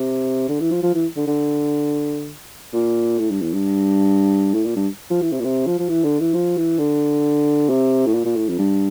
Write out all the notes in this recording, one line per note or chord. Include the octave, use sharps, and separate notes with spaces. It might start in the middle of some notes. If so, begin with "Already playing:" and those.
Already playing: C3
D3
E3
F3
F3
E3
D3
D3
A#2
A2
G2
E2
G2
A2
A#2
G2
F3
E3
C3
A#2
C3
F3
F3
E3
D3
E3
F3
E3
D3
C3
A2
A#2
A#2
A2
F2
G2